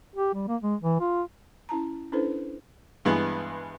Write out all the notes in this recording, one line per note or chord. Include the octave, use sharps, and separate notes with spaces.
G4
G3
A#3
G#3
E3
F4
C#4 E4 A5 A#5
C#4 D4 E4 A4 B4 C5
G2 E3 G#3 B3